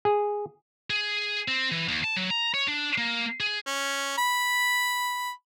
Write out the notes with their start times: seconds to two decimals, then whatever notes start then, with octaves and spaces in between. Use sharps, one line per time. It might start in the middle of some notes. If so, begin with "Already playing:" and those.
0.05 G#4
0.90 G#4
1.48 C4
1.72 E3
1.88 D#2
2.04 A5
2.16 F#3
2.30 A#5
2.54 C#5
2.68 D4
2.98 A#3
3.40 G#4
3.67 C#4
4.18 B5